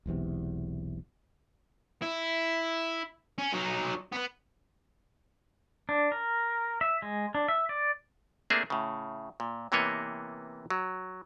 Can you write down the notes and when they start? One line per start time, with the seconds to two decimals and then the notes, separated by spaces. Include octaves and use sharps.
0.06 E1 B1 E2 C3
2.02 E4
3.38 C#4
3.53 F#3 D#4
4.12 B3 B4
5.89 D4
6.12 A#4
6.81 E5
7.02 G#3
7.35 D4
7.48 E5
7.69 D5
8.50 A3 A#3 C4 D4 G#4 E5
8.70 A2 C#3
9.40 A#2
9.72 C3 E3 A#3 B3 C#5 D#5
10.70 F#3